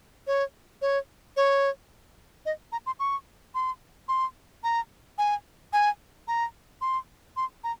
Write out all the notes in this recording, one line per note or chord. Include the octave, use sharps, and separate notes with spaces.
C#5
C#5
C#5
D#5
A#5
C6
C#6
C6
C6
A#5
G#5
G#5
A#5
C6
C6
A#5